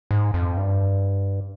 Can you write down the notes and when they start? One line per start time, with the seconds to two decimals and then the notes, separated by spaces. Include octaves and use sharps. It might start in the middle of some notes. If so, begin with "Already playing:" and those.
0.11 G#2
0.34 F2
0.57 G2